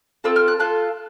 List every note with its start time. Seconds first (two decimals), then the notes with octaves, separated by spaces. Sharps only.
0.24 C4 F4 A4 E6
0.36 F6
0.48 F#6
0.59 F4 A4 F#6